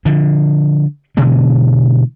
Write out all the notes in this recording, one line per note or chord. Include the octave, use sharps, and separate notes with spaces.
D3 F3
B2 D3 E3 G#3